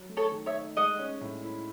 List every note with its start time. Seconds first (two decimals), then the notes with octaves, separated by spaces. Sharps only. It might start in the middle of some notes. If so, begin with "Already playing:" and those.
Already playing: F#3
0.09 A3
0.17 A4 C#5
0.32 D#3
0.46 C#5 E5
0.55 D#4
0.77 G#3 D#5 F#5
0.99 C#4
1.21 A2
1.43 E4